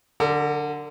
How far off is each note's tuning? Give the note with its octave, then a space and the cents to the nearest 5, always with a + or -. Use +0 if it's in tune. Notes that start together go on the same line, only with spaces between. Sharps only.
D3 +0 A#4 -40